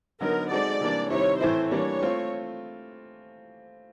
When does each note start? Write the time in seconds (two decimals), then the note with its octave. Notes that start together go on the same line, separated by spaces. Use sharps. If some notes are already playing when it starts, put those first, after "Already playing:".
0.21 D3 F#3 B3 D#4 A#4
0.51 G#3 C4 D#4 F#4 A4 D5
0.81 C3 E3 G3 A#3 D4
1.10 C3 D#3 G3 C4 E4 C#5
1.40 A2 E3 A3 C4 E4 C5
1.71 E3 G3 A#3 D4 C#5
2.01 A3 C4 F4